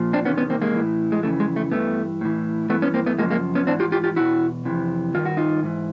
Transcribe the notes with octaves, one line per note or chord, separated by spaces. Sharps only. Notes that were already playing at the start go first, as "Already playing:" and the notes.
Already playing: A#2 F3
C4 D4
E2 C3 D#3 B3 C#4
B3 C#4
A#3 C4
G#3 A#3
A2 E3
G#3
F2 C#3 E3 A3
G#3
A3
G2 E3 A3 B3
A2 E3
G2 E3 A3 B3
B3 C#4
A#3 C4
A3 B3
F#2 C#3 F3 G#3 A#3
G#3 A#3
B3 C#4
G#2 E3 C4 D4
F4 G4
F4 G4
F4 G4
E2 B2 E4 F#4
F2 C3 E3
G2 D#3 F4
F#4
D#4 F4
G#2 E3